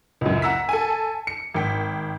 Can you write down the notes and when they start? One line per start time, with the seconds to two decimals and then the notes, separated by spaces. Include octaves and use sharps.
0.21 C#2 F#2
0.42 F#5 A#5 E6 B6
0.69 A4 G#5
1.27 C#7
1.54 G#1 G5 B6